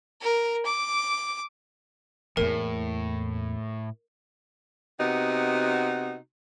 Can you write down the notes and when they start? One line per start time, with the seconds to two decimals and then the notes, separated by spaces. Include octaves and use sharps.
0.22 A#4
0.66 D6
2.37 E2 A2 A#3 A#4
5.00 C3 B3 D#4 F#4